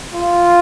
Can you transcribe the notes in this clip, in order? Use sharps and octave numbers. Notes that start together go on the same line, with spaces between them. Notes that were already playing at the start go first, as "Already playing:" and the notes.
F4